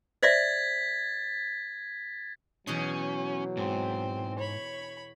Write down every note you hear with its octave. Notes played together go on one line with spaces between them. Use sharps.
C5 D5 E5 G#6 A6 B6
E2 B2 F#3 C#4 G#4
G#2 C4
C#5 B5